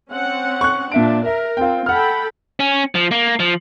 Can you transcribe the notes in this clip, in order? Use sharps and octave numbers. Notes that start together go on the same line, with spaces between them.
C4 C#4 F#5
C#6 F#6
A#2 D4 E5 D7
A#4 E5
C4 F4 G5
A4 F#5 G5 B5 F6
C#4
F3
A#3
F3